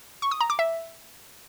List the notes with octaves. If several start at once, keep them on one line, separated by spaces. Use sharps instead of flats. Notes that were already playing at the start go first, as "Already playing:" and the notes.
C#6
D#6
A#5
D6
E5